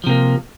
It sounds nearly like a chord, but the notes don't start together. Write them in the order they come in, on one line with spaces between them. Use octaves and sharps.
F3 C3 A#3